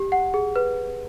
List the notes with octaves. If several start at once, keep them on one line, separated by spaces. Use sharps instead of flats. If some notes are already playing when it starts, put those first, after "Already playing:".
Already playing: G4
F#5
G#4
B4